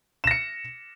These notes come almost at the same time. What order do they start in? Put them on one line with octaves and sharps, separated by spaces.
E7 A#6 C#7